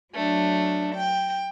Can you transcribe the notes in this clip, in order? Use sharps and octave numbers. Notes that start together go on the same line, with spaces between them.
F#3 A3 D4
G5